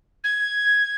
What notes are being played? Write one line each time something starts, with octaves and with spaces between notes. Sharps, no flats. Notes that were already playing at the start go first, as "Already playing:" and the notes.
G#6